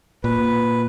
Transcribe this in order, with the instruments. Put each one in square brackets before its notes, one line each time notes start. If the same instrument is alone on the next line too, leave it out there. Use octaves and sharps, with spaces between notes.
[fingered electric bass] A#2 [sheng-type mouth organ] B4